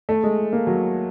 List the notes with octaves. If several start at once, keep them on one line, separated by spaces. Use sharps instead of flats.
A3
G#3
A#3
F#3